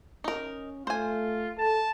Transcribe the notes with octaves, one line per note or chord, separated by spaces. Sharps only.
C#4 D#4 A#4
A3 F4 C5 G#5
A4 A5